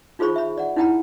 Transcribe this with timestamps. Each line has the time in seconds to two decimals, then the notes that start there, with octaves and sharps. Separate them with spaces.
0.19 D#4 F4 G#4 C5 B5 C#6
0.36 E5 B5
0.58 D5 F#5
0.76 D#4 E4 F#5 G5 A#5 B5